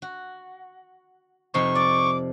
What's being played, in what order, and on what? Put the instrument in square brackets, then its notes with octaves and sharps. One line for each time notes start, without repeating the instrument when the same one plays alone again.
[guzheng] F#4
[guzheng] F2 C3 D#4 [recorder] C#6
[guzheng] D5 [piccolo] D6